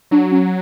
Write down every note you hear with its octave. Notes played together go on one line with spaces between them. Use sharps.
F#3 D4
C#4